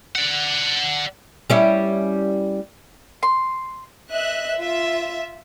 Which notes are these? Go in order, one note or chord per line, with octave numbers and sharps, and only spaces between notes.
D5 F#5
G3 C#4 E4
C6
D#5 E5 F#6
F4 E5